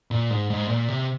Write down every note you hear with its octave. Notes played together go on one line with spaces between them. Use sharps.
A#2
G#2
G#2
A#2
C3